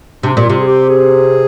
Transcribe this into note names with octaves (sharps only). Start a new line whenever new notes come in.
C3 D4
A#2 G4
C3 F4
G#4
G4
G#4